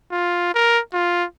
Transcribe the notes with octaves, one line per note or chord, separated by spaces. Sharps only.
F4
A#4
F4